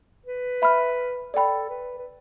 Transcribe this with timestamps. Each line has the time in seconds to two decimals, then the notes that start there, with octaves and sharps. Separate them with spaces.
0.26 B4
0.62 E5 B5 F6
1.34 A4 D5 G5 B5
1.70 B4
1.99 B4